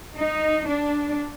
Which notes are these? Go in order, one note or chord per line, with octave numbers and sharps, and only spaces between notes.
D#4
D4